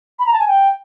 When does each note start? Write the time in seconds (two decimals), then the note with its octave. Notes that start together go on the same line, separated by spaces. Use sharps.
0.19 B5
0.26 A#5
0.33 A5
0.40 G#5
0.48 G5